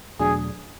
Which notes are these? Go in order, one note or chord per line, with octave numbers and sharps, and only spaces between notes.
E2 B2 F#3 A3 D4 G#4